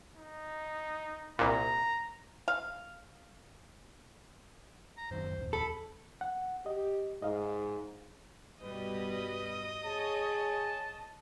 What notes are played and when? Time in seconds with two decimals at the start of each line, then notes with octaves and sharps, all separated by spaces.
0.16 D#4
1.39 C2 A#2 A#5
2.48 F5
4.97 A#5
5.11 F#1 F#2 D#3 C5
5.38 D#1 F2
5.53 A4 B5
6.21 F#5
6.66 G4 D#5
7.22 G#2 D#5 F5
8.62 G2 B2 G3 B4 D#5
9.85 G#4 C#5 A5